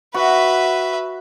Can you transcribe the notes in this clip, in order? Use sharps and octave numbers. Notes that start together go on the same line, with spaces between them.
F#4 B4 E5